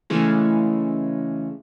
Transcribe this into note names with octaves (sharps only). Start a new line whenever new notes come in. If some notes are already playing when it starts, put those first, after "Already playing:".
C#3 E3 G#3 A3 C#4